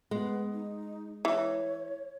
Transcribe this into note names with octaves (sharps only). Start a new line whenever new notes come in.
G#3 B3
D#4
E3 C#5